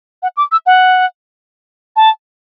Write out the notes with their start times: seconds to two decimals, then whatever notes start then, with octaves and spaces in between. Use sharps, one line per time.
0.23 F#5
0.37 D6
0.52 E6
0.66 F#5
1.96 A5